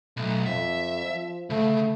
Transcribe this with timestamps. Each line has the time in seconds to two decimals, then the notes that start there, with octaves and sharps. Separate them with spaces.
0.17 B1 A3
0.46 F2 E5
1.05 F3
1.50 C#3 A3